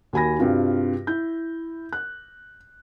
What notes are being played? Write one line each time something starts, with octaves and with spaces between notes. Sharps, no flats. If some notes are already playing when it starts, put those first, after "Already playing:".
D#2 F#4 G#5 B5 A#6
G2 C3 G3 F4 F#4
E4 G6
F#6